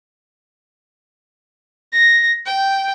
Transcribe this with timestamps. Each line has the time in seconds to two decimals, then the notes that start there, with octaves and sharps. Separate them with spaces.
1.93 A#6
2.46 G5